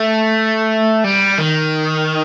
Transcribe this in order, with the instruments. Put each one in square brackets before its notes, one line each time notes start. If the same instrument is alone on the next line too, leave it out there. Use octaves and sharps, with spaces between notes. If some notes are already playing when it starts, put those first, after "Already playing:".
Already playing: [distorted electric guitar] A3
G3
D#3